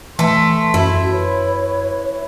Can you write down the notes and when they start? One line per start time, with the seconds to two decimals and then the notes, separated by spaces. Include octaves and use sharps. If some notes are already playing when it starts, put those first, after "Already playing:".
0.19 E3 A3 C6
0.74 F#2 E4 F#4
1.11 B4 C#5